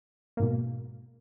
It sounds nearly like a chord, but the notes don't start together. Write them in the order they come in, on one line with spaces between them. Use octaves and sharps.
A#3 G#2 B2